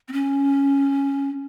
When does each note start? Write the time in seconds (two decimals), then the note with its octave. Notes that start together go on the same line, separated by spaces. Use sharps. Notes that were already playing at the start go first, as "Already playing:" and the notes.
0.08 C4
0.13 C#4